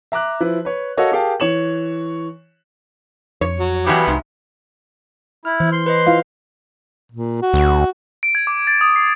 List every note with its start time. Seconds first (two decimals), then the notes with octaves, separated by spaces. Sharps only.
0.12 E5 A#5 D6 F#6
0.40 F3 E4 B4
0.65 B4 C#5
0.97 F#4 A4 A#4 C#5 D#5 F5
1.12 G4 G#4 A#4 F5 G5 A5
1.40 E3 C#5 C#6 E7 F#7
3.41 F2 C#5
3.60 F#3
3.87 G2 B2 E3 B3 G4
4.08 C2 G#2
5.45 E4 F6
5.60 E3 C5
5.72 C6
5.86 B4 C5 D#5
6.07 E4 F4 F5
7.12 A#2
7.42 F#4
7.53 D2
8.23 D7
8.35 G#6
8.47 D6
8.67 A6
8.81 D#6
8.96 C7